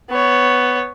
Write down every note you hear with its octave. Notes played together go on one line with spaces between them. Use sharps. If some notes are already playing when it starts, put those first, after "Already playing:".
B3 C#5